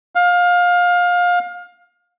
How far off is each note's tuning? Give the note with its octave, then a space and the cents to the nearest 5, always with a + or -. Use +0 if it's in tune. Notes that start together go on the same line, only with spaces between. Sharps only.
F5 +25